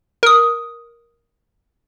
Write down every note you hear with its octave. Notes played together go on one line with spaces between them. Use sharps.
A#4 D#6